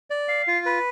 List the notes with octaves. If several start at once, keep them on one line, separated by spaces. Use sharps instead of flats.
D5
F5
F4
B4